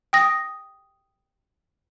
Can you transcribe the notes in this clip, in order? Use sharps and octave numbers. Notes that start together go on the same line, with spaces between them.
G5 D#6 A#6